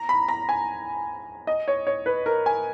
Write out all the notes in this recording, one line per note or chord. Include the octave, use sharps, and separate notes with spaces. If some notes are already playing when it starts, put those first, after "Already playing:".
Already playing: A#5
B5
A#5
G#5
D#5
C#5
C#5
B4
A#4
G#5